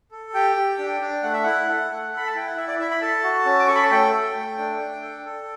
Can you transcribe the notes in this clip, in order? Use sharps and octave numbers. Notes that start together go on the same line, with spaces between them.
A4
G4 G5
G4
D4
D4
A3 F#5
E5
E4 F#5
A4
A3
A4 B5
A5
E4 G5
F#5
E4 E5
D5
E4 E5
B5
A4 A5
F#4
C#4
D6
A4 C#6
B5
A5
A3 G5
A4
A3
D4
D4
A4
A4